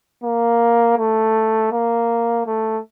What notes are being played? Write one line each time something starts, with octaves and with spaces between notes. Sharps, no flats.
A#3
A3
A#3
A3